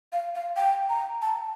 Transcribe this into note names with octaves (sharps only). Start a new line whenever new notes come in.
F5
F5
G5
A#5
A5